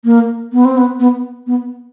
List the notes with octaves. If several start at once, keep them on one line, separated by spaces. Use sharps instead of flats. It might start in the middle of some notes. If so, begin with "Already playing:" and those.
A#3
B3
C4
B3
B3
B3